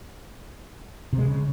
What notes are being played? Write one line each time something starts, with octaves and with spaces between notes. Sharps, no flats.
C3
G#3
C#3